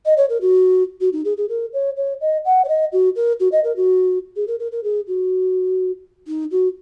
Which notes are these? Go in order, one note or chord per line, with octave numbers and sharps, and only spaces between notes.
D#5
C#5
A#4
F#4
F#4
D#4
G#4
G#4
A#4
C#5
C#5
D#5
F#5
C#5
D#5
F#4
A#4
F#4
D#5
A#4
F#4
G#4
A#4
A#4
A#4
G#4
F#4
D#4
F#4